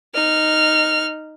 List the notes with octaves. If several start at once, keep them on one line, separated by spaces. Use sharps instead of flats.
D#4 F6